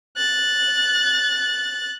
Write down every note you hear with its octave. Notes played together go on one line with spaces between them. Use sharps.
F#6 A6